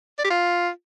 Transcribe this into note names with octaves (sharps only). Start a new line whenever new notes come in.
D5
G4
F4